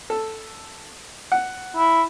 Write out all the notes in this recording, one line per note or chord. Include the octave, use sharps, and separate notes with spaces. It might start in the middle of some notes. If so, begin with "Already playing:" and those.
A4
F#5
E4